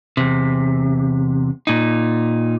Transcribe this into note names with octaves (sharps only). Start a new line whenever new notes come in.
E2 C3
A#2 D#4